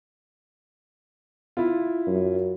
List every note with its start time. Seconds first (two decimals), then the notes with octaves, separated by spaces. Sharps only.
1.57 E4 F4
2.07 F#2